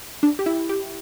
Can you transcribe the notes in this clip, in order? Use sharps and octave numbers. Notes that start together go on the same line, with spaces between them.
D4
G4
E4
G4